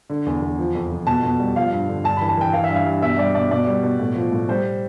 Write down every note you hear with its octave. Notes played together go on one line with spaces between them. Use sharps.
D3
E2
E2
F3
F2
F2
B2 A5
B2
G3
F3 F5
G2
D3
G2 A5
E3 B5
A5
E3 G5
E3 F5
E5
G2
F5
G2
B2 E5
G3 D5
B2 D5
B2 D5
G3
B2
A2
F3
A2
G3 C5